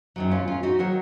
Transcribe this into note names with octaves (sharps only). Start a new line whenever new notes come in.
F#2 D#3 F#3
C#4 F4
C#4 F4
D#4 F#4
D#3 F#3 A#4 C#5